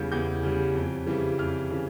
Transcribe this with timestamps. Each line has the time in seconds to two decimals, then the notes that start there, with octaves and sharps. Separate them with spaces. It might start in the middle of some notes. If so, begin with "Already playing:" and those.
Already playing: E2 C#3 G3 G6
0.12 E2 G6
0.43 C#3 G3
0.75 F2
1.07 C#3 E3 G3
1.38 F2 F6
1.70 C#3 E3